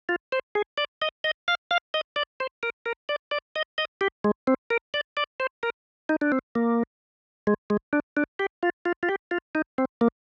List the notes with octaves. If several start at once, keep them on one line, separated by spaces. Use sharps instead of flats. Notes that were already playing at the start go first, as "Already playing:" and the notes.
F4
C5
G#4
D5
D#5
D#5
F5
F5
D#5
D5
C5
A#4
A#4
D5
D5
D#5
D#5
G4
G#3
C4
A#4
D5
D5
C5
A#4
D#4
D4
C4
A#3
G#3
G#3
D4
D4
G4
F4
F4
F4
G4
F4
D#4
C4
A#3